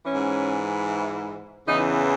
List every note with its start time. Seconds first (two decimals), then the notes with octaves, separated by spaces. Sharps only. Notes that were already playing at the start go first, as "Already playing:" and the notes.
0.06 G#2 E3 C#4
1.67 E2 C#3 E3 D#4